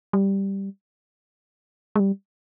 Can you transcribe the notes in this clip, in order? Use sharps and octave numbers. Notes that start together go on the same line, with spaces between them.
G3
G#3
G3